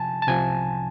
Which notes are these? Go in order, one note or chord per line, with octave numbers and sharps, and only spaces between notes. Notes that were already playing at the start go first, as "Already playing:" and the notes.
Already playing: C3 F3 G#5 A5
A5
C2 C3 F3 G#5